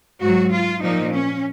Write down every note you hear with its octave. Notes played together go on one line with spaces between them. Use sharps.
G#2 F#3 F#4
F4
A#2 F3 D#4
C#4